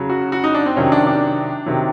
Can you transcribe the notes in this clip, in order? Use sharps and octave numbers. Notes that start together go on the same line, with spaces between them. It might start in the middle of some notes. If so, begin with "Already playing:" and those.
Already playing: C#3 F#3
F#4
F#4
D#4
D4
C4
C3 D#3 F#3 C#4
D4
D4
C3 D#3 F#3